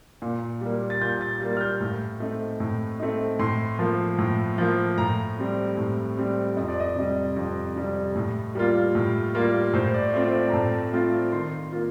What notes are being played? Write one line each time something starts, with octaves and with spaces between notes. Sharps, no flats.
A#2
G3 A#3
A6
A#2 G6
A6
G3 A#3 A6
F6
G6
A2
A3 C4 D#4
A2
A3 C4 D#4
A2 C6
F3 A#3
A2
F3 A#3
A2 A#5
G3 C4
A2
G3 C4
F2 D#5
D5
D#5
C3 G3
F2
C3 G3
A2
G3 A#3 F4
A2
G3 A#3 F4
A2 C5
D5
A3 C4 F4 C5
D5
A#5
A2 A5
A3 C4 F4
D#3 C6
A#3 F4